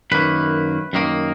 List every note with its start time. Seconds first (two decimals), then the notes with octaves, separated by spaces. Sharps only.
0.12 F#2 D#3 A#3 B4
0.93 F#2 D#3 A#3